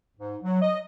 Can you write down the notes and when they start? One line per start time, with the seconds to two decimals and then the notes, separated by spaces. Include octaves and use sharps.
0.17 G#2
0.43 F#3
0.62 D#5